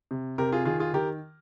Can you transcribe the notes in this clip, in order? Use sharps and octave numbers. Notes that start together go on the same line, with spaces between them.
C3
C3 G4 A#4
F4 G#4
D#3 F4 G#4
F4 G#4
D#3 G4 A#4